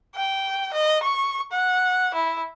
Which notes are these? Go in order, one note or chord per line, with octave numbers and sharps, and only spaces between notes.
G5
D#5
C#6
F#5
E4